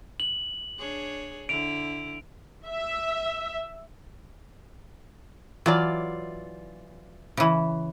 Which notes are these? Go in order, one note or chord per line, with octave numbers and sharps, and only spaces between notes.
F#7
D4 G#4 C#5
D3 E4 D7 F7
E5
E3 F#3 F4 D5
C#3 E3